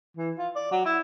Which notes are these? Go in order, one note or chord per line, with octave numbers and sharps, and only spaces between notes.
E3
F4
D5
F#3
E4